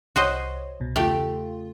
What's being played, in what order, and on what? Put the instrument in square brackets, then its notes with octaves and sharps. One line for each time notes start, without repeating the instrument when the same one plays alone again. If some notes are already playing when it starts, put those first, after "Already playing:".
[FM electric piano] C2 C#5 [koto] F#4 C5 D#5
[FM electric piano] C2 B2
[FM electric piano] E2 C#3 F4 [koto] A3 G4